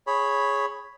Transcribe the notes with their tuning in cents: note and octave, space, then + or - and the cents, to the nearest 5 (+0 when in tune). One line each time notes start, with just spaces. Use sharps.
G#4 +0 C#5 +0 B5 +0